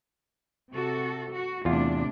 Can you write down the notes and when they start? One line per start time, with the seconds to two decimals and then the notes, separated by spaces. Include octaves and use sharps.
0.73 C3 F#4 A4
1.32 F#4
1.65 E2 A2 C3 D4 F4